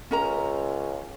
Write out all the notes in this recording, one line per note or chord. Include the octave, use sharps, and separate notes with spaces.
C#2 C#4 A#4 A#5